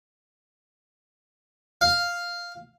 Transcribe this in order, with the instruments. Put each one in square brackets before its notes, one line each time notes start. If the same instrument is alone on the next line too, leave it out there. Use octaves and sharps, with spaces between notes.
[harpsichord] F5